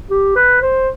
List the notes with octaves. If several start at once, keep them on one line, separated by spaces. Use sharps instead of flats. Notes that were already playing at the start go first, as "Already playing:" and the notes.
G4
B4
C5